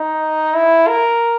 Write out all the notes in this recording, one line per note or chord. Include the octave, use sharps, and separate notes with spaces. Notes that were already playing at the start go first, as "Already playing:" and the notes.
Already playing: D#4
E4
A#4